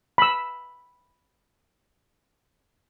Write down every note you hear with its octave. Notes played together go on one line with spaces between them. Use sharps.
B5 E6